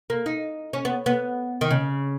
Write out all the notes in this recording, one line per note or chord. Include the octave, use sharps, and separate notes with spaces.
A#3
D#4
C#4
B3
B3
D#3
C#3